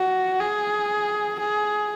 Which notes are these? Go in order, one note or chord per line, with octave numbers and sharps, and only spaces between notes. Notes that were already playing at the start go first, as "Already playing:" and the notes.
Already playing: F#4
G#4
G#4